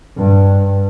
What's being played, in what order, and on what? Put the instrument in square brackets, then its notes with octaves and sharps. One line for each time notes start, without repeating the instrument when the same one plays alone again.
[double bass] G2